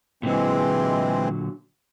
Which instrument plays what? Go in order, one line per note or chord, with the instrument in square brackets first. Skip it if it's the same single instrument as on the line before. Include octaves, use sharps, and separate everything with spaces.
[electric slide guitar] A#2 D3 F#3 [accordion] E3 G#3 C4